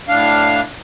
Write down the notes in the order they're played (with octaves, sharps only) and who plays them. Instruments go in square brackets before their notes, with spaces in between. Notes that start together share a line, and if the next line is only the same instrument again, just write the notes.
[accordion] A2 D4 F5